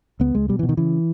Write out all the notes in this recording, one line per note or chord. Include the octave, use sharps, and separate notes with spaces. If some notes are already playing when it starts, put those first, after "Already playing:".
C#2 B3
C#2 G#3
B2 G3
E3
B2
D#3
C#3 E3